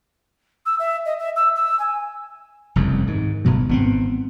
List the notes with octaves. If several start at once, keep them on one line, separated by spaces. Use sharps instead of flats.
E6
E5
D#5
E5
E6
E6
G#5
F1 C2 F#2
G#2 D#3
G1 G2 B2 F#3
G#1 B3 C4